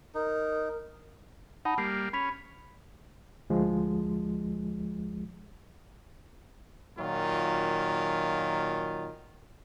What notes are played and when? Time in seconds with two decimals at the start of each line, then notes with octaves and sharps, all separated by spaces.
0.15 D#4 A#4
1.65 D#4 F#5 A5 B5
1.78 G3 A#3 F6 C7
2.13 C#4 B5 B6 F7
3.50 D2 F3 G#3
6.98 A#2 D#3 F#3 F4